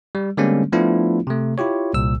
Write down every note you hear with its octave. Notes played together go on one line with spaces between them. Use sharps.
G3
D3 G3 G#3 A#3 C4 C#4
F3 A3 B3 D4 E4 F4
C3 A3
E4 F4 G4 C#5
C2 A#2 E6